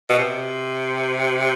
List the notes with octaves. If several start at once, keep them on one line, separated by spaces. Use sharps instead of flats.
B2
C3